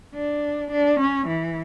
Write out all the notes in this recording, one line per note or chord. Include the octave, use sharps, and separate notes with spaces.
D4
D4
C#4
E3